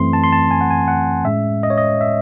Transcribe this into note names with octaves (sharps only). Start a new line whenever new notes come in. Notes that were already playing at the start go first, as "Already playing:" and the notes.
Already playing: F#2 E3 A3 C4 C6
A5
C6
A5
G#5
F#5
G#5
F#5
A2 G#3 C#4 E5
D#5
C#5
D#5
E5